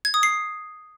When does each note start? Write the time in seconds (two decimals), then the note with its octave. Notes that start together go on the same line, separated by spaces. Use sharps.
0.05 G#6
0.14 D#6
0.23 C7